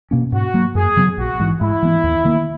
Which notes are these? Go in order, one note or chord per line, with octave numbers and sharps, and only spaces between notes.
B2 A#3 C#4
G#2 F#4
F#3 A#3
F#2 G#4
C#3 F#3 B3
A#1 F#4
G#2 E3
G#2 E4
E3 B3
D#2
D#3 A#3